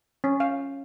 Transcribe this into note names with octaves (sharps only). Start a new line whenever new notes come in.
C#4
F5